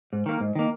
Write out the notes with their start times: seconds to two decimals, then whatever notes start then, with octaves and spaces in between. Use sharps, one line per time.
0.13 G#2
0.26 D#3 A#3
0.40 G#2
0.55 D#3 A#3